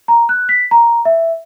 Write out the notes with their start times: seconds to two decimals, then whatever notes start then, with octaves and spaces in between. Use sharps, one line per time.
0.08 A#5
0.29 F#6
0.49 B6
0.71 A#5
1.05 E5